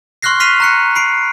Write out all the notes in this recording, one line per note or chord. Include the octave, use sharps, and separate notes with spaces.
C6 C#6 F6 F#6 A#6 C7
C#6 F6 B6 C7 D#7 F7
A#5 F#6 C#7
B5 C7 D7